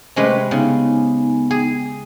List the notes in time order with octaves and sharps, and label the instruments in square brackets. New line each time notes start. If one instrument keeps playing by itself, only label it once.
[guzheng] C3 G#3 B4 [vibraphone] A3 C#4 C5
[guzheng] C#3 [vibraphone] B3 D#4 G#5
[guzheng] G#4